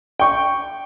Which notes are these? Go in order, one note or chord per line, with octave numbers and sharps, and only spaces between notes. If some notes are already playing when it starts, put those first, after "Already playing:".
G5 C#6